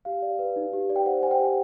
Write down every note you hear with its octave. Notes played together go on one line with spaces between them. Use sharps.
G4 F5
D5
B4
D#4
G4
D5
G5
C5 F#5
C5 G#5
G5
G4